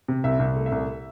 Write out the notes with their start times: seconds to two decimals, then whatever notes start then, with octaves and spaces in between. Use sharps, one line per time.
0.08 C3
0.24 C2 E5
0.39 C2
0.56 A3
0.66 E5
0.72 C2